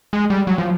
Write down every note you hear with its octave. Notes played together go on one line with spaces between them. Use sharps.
G#3
G3
F#3
F3